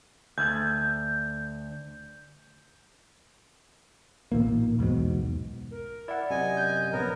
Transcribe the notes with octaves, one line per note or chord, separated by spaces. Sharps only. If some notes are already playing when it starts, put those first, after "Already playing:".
D2 G6
A1 A#2 D#3 A#3
B1 E2 G#2 B2
A#4
E4 D5 F#5
F#2 C3 D#5 G#5
G6
A#1 B3 A#4 C#5